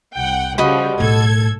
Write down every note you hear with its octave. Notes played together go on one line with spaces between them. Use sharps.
C2 F#5 G5
C#3 F3 G3 F#4 D#5 B5
B1 A2 A4 G#6